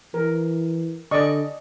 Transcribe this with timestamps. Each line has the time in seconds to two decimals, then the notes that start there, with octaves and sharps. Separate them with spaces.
0.14 E3 A#4
1.11 D3 D5 D#5 C#6